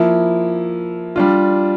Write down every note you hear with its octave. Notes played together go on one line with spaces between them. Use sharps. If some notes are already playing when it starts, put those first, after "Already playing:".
Already playing: F3 A#3 E4
G3 D4 F4